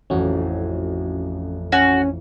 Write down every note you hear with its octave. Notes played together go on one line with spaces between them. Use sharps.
A1 F2 C#4 F#4
C#4 F#4